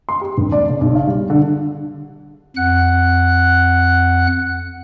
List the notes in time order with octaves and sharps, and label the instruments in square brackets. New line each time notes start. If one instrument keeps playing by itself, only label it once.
[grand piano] C6
G4
D#1
D5
C#3
B1
F5
G3
D3
[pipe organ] F2 F#5 F#6